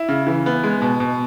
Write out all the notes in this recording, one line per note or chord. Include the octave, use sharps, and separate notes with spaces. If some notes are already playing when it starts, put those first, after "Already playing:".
Already playing: E4
C#3
E3
B3
G#3
B2
B2